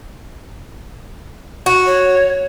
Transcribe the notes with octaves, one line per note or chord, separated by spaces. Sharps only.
F#4
C#5